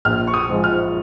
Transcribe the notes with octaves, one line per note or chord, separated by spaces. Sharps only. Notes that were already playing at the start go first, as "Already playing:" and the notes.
A#1 F6
C#6
D#6
G#2 F3 G#3
F6